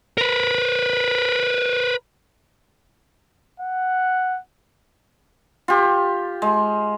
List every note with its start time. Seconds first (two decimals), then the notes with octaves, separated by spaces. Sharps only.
0.18 A#4 B4
3.60 F#5
5.68 F4 G4
6.42 G#3